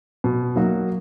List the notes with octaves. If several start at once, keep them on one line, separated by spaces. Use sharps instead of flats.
B2
F#3 A#3 D#4 F#4